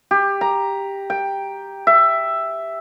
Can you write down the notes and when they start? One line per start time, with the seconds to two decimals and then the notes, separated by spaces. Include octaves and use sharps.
0.11 G4
0.41 A#5
1.10 G5
1.87 E5